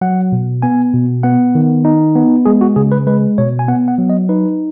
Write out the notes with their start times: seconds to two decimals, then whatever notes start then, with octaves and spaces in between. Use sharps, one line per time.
0.01 F#3 F#5
0.32 B2
0.62 B3 G#5
0.94 B2
1.23 B3 F#5
1.55 D#3
1.85 D#4
2.15 B3
2.45 G#3 G#4
2.61 F#4
2.76 C#3 G#4
2.92 B4
3.07 G#3 B4
3.38 B2 C#5
3.59 G#5
3.68 B3 F#5
3.88 F#5
3.98 F#3
4.10 D#5
4.29 D#4 B4